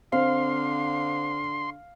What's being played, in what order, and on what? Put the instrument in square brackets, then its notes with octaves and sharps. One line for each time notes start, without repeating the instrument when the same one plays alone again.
[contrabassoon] D3 [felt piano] C4 [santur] F5 [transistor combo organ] C6